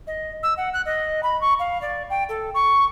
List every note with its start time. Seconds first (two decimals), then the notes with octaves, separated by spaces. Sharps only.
0.07 D#5
0.43 E6
0.57 F#5
0.73 F#6
0.85 D#5
1.23 B5
1.41 C#6
1.59 F5
1.82 D5
2.10 G5
2.29 A4
2.54 C#6